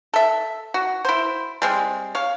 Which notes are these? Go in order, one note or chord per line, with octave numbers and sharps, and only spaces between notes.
A4 E5
F#4
E4 C5
G3 G#3 C4
C#5 F5